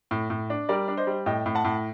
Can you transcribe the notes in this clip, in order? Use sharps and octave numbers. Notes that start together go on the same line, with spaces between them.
A2
A2
D4
G3 A#4 D5
D4
C5 D#5
G3
A2 D#5 G5
A2
F#5 A5
A2